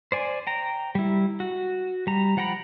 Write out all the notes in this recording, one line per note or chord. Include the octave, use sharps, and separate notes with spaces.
C5 D5 G#5
G5 A#5
G3 E4
F#4
G3 A#5
F3 F#5 G5 A#5 B5